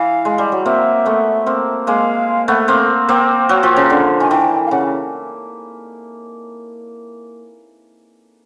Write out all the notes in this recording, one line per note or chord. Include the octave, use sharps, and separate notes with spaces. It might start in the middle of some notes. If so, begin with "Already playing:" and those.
Already playing: E3 F5
G#3
G3
F#3
A#3 C4 E5
A3 B3
A#3 C4
G#3 A#3 F5
A3 B3
A#3 C4
A#3 C4 G5
F#3
F3
C#3
D3
D#3 G#5
E3 G5
F5
C#3 F#5